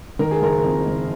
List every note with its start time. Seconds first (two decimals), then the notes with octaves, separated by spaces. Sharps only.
0.19 D#3 A#4
0.31 G#4
0.41 F#1 A#4
0.64 F2
0.87 F#1